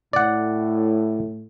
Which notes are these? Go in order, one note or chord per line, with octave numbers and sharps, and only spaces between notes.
A2 D5 F#5